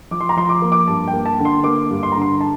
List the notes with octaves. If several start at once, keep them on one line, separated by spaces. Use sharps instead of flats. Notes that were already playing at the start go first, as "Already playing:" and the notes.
F3 D6
C6
A#5
F3 C6
D6
A#3
D6
G2 A5
G5
A#3
A5
D3
C6
A#3 D6
G2
C6
D3 A#5
C6
A5